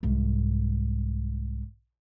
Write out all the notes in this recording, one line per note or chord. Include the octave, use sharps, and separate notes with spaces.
C2 G#2